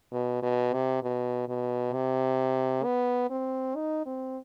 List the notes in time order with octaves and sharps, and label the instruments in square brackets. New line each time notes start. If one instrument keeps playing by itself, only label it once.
[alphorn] B2
B2
C3
B2
B2
C3
B3
C4
D#4
C4